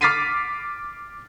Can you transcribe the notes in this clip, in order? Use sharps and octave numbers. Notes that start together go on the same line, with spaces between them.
D6 F6 A6 B6 C7 D#7